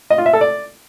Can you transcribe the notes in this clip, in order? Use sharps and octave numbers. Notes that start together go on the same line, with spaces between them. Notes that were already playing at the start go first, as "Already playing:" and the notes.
D#5
F4
E5
A4
D5